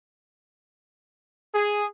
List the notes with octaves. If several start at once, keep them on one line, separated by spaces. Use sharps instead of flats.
G#4